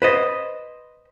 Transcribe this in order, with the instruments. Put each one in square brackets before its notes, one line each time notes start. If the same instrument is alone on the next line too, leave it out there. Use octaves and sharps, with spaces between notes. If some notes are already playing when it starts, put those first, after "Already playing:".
[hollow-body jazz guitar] B4 C5 D#5